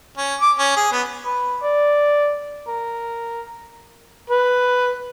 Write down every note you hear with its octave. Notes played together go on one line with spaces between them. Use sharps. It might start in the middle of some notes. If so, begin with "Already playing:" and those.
C#4
D6
C#4
G#4
B3
B4
D5
A#4
B4